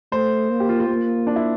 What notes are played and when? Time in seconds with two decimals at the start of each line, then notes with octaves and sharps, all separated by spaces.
0.12 A3 C5
0.51 A#3
0.60 G4
0.69 F4
0.80 F4
0.89 A#3
1.27 D4
1.36 E4